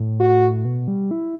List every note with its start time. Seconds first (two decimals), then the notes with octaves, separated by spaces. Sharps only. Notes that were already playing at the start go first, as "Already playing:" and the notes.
Already playing: A2
0.20 F#4
0.65 B2
0.88 G3
1.11 E4